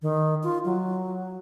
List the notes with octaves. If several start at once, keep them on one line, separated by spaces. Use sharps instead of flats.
D#3
F4
F#3